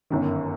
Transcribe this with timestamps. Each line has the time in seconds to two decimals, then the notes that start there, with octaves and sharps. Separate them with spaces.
0.10 G1 F#2 D#3